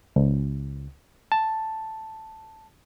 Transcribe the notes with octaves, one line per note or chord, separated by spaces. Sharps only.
C#2
A5